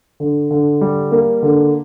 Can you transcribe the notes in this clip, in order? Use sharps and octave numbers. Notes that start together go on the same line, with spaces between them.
D3
D3
G3
A#3
D3